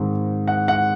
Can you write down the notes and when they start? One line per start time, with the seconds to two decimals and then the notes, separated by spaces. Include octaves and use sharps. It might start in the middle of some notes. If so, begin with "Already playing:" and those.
Already playing: G#2 D#3 G#3 C4
0.48 F#5
0.68 F#5